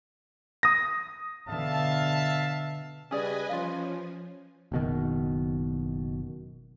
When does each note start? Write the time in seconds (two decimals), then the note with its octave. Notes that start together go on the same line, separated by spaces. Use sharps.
0.63 D#6 A#6
1.48 B2 D3 E5 F5 A5
3.11 C#3 G3 C#4 G#4 B4 D5 D#5 G#5
3.49 F3 C#4 F4 F5
4.72 F#1 B2 D#3